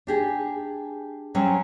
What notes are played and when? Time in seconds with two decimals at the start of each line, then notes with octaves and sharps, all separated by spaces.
0.07 D4 G4 G#4
1.35 F#3 G3 C4 C#4